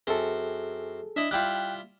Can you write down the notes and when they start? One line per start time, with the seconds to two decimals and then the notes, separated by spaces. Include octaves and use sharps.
0.07 F#2 C4 G#4 A4
1.16 D4 E4 D#5 E5
1.31 G3 E4 F4 G5 F#6